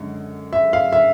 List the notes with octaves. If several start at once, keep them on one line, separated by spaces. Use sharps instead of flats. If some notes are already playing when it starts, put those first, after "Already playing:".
Already playing: F#2 D3 G#3
E5
F5
E5